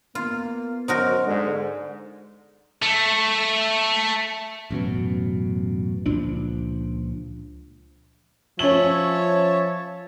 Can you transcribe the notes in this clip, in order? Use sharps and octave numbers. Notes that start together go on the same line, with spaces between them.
A#3 B3 F4
F#2 D#4 F#4 A#4 C5
G#2 D3 G#3
A3
A1 F#2 B2
C#2 A#2 F3 D4
F3 C#4 C#5 E5 A5 F#7